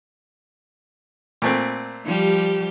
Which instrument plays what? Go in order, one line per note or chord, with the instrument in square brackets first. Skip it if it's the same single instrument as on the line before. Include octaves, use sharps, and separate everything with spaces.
[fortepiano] A#2 A3 C4
[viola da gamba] F3 G3 G4